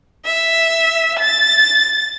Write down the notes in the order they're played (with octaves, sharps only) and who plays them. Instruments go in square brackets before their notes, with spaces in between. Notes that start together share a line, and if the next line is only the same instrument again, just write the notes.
[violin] E5
A6